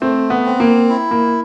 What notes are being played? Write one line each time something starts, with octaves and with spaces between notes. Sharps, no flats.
A3 C4
B3
C4
A#3
E4
A#3